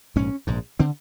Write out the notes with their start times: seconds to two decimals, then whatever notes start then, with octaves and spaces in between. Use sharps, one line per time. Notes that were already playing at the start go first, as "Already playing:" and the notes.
0.16 A#1 G#2 C#4
0.47 A#1 G#2
0.79 D3 C4